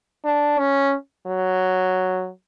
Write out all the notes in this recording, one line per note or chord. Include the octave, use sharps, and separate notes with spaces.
D4
C#4
F#3